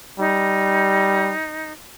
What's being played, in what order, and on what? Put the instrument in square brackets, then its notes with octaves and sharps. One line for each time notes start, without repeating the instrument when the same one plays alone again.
[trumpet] G3 [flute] D#4